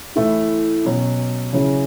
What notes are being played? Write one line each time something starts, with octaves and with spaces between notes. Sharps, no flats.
A2 E3 A3 E4
B2 F#3 C#4
C#3 F#3 C#4 E4